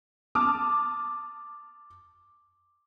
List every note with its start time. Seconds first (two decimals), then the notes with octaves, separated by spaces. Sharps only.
0.35 A5 D6 D#6 F6